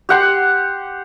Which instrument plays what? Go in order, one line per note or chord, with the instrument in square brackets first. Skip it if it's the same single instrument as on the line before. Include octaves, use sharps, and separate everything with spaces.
[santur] G4 F#5 C6